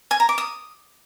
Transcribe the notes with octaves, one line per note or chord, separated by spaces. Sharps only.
G#5
A#5
D6
D#6